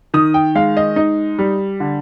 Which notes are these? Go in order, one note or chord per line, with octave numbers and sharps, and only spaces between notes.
D#3 D#6
G5
G#3 F5
D#5
D#4
G3
D3